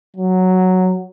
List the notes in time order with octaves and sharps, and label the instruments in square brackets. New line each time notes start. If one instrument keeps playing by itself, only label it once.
[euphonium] F#3